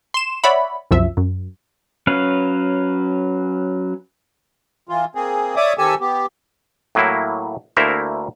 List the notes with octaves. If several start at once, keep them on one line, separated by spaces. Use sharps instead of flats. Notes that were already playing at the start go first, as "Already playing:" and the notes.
C6 E7
C#5 D5 E5 F#5 B5
C2 F#2 F3 E5
F#2
F#3 C#4 B4 F5
E3 F4
A#3 C4 G#4
C#5 D5 E5 D6 D#6
D#3 C4 G4 A4 G#5 E6
B3 G4
A2 F#3 A#3 E4
D2 A3 A#3 E4 A#4 C5